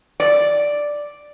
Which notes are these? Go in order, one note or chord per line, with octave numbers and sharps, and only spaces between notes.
D5